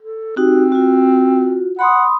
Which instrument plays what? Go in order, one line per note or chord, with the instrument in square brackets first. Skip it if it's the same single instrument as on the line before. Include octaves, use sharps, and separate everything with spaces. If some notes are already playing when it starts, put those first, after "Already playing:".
[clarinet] A4
[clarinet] C4 [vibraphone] D#4 F#4 G4
[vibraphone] F4 F#4
[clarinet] F#5 [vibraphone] B5 C6 D#6